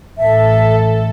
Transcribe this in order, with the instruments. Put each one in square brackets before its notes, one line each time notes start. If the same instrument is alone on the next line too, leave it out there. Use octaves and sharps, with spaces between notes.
[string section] A1 A4 [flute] E5